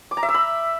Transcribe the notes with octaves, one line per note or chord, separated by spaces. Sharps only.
D6
A#5
E5
E6
B5